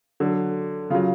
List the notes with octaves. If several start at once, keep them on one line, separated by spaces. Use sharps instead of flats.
D3 F#3
C#3 F#3 F4